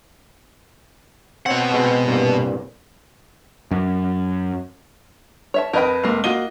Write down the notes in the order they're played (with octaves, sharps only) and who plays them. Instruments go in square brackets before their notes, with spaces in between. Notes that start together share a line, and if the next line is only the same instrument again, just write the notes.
[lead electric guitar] B2 F#5 [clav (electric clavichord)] C4 C#5
[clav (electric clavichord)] G#3 C4 B4
C2 G2 A#2
[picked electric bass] F#2
[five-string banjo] C#5 E5 A5
[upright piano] F2 B4 [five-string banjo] A#4 D#5 G5
[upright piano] F1 [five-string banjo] G#3 A#3
[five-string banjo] A#3 F4 F#4 [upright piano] D#5 D#7 G7